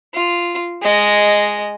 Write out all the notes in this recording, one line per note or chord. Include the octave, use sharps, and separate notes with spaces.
F4
G#3 D#5